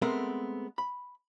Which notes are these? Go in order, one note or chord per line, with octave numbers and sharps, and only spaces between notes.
G#3 A3 B3 C4 A#4
B5